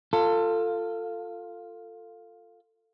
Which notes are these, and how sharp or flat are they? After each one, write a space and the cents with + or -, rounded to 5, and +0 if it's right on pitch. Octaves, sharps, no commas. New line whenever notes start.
F4 +0 A4 +20